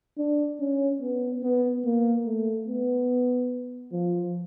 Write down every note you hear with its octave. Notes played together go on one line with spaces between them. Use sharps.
D4
C#4
B3
B3
A#3
A3
B3
F3